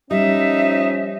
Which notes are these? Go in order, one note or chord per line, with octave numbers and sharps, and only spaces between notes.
F3 G3 C#4 D#4 E5